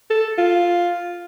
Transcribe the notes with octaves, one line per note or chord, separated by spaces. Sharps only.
A4
F4